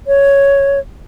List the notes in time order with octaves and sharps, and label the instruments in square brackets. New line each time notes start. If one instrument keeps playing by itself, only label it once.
[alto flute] C#5